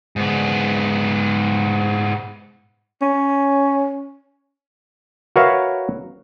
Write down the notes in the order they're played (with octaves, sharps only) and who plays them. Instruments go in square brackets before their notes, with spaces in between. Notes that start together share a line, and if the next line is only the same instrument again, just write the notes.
[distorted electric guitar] G#2 B3
[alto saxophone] C#4
[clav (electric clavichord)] F#4 A#4 B4 C#5 E5 F5